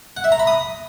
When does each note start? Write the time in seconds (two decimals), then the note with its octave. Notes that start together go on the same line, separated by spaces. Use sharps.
0.17 F#5
0.24 E5
0.32 A#5
0.40 B5
0.47 D#6